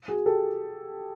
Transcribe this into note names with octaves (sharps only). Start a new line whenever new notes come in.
F#4 G#4
G4 A4